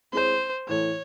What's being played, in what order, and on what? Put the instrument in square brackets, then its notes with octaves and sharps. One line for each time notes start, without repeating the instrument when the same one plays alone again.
[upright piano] G#3 C4 E4 G#4 C#5 [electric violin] C5
[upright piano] A2 E3 A3 [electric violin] C#5